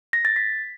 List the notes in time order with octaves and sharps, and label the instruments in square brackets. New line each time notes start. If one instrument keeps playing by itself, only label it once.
[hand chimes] A#6
A6
B6